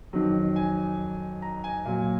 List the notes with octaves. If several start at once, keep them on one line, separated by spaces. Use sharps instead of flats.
F2 D#3 F#3
G#5
A#5
G#5
A#2 F#3